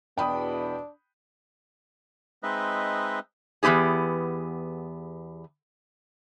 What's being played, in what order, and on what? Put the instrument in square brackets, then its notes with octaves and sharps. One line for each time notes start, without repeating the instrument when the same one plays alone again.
[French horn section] E2 B2 B3 [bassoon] D4 [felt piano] G5 B5 D#6
[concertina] G#3 C4 D#4 B4 D#5 E5
[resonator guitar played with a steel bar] E2 F3 B3 G4 G#4